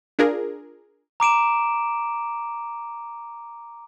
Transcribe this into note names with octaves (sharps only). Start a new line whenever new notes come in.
D4 F4 G#4 A#4
A#5 D6 D7 E7